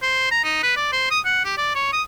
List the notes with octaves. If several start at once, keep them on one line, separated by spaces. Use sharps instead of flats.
C5
A#5
D#4
B4
D5
C5
D#6
F#5
G4
D5
C#5
D#6